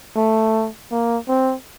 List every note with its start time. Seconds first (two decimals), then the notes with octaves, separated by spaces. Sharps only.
0.16 A3
0.91 A#3
1.28 C4